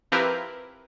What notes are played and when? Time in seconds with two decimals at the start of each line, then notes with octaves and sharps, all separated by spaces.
0.12 F3 C4 E4 G4 A#4 B4